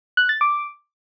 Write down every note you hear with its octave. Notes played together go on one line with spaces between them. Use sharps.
F#6
A6
D6